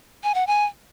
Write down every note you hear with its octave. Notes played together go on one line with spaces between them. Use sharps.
G#5
F#5
G#5